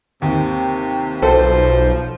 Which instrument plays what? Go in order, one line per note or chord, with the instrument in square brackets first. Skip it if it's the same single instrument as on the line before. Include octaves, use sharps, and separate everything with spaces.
[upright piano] D#2 [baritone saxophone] C3
[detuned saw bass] B1 [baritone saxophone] F3 [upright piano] A4 [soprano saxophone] C5